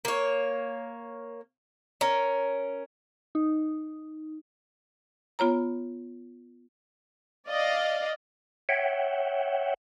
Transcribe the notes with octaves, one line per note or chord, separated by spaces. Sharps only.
A#3 C#5
C#4 A#4
D#4
B3 F4 C#5 A#5
D5 D#5 F5
C#5 E5 F#5 G5